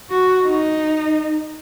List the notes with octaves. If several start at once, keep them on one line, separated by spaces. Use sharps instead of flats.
F#4
D#4